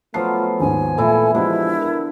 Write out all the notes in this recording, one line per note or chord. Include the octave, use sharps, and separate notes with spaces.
F3 F#3 A3 B3 F4 B4 C7
D#2 G#2 G#5
A#2 E3 A3 E4 A4
D3 F3 G#3 E4 G4
A#4